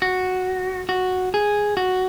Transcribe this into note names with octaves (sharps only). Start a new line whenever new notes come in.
F#4
F#4
G#4
F#4